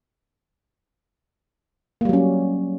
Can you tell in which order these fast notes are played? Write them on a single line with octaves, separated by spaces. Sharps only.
A#3 G3 F#3 C#4